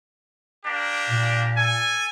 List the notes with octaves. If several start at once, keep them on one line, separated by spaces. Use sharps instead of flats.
A#3 D4 G4
A#2
A4 G#5